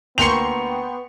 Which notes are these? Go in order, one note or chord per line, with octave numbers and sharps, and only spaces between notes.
D2 A#3 B3 G5 C6 C#6 C#7 F7